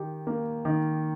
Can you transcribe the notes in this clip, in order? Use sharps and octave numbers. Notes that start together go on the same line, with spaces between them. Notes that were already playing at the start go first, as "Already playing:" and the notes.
Already playing: D#3 G4
A#3
D#3